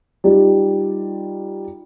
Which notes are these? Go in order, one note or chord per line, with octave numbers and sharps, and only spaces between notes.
G3 D#4 F4 G4